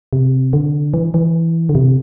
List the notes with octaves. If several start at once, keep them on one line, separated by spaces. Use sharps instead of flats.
C3
D3
E3
E3
D3
C3